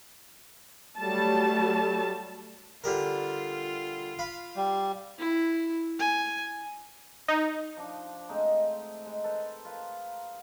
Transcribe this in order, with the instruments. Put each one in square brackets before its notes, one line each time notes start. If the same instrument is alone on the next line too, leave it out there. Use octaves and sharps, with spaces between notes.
[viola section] F#3 G3 A3 A5
[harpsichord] D3 G3 A#4 [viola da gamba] F4
[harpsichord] F5 B5
[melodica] G3
[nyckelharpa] E4
G#5
[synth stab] D#4
[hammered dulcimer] F3 D4
G#3 A3 C4 D#4
G#3
A4 B4 C5
F4 A#4 B4